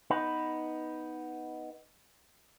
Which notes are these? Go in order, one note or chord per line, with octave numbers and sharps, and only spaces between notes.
B3 D#4 B4